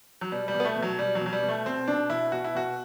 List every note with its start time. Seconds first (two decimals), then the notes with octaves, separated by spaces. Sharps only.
0.21 F#3
0.32 B2 G3
0.48 G3
0.54 B2
0.60 B3
0.65 A3
0.76 B2
0.82 F#3
0.99 B2 G3
1.15 F#3
1.21 B2
1.26 F#3
1.33 G3
1.43 B2
1.48 A3
1.66 B2 C4
1.88 B2 D4
2.10 B2 E4
2.32 B2 F#4
2.44 E4
2.55 B2 F#4